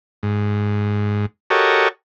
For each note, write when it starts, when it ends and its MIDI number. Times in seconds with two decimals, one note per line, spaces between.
0.23 1.26 44
1.50 1.88 66
1.50 1.88 67
1.50 1.88 69
1.50 1.88 70
1.50 1.88 73
1.50 1.88 75